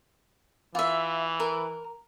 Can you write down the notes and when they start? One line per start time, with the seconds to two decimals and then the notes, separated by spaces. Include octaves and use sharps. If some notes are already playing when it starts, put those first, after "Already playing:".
0.75 E3 F4 E5
1.40 A#4